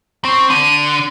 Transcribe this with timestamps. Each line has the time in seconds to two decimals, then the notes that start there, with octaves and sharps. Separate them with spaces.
0.25 C4 C#6
0.50 D3 D#7